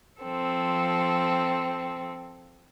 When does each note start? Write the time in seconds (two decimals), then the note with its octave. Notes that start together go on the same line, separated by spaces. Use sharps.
0.22 F3 C4 A4